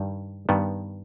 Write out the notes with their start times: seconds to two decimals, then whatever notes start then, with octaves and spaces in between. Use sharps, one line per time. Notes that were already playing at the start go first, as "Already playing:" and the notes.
Already playing: G2 D#3 G3
0.49 G2 D#3 G3 B3